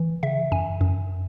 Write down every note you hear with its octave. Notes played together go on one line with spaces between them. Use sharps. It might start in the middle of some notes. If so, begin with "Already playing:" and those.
Already playing: E3
C#3 E5
F#2 G#5
F#2